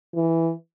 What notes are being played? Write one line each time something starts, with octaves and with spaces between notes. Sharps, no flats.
E3